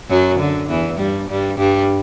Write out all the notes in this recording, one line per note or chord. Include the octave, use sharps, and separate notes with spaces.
F#2 F#3
D3
E2 E3
G2 G3
G2 G3
G2 G3